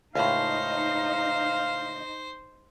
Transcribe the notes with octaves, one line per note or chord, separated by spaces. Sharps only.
C#2 A2 D#4 C5 F5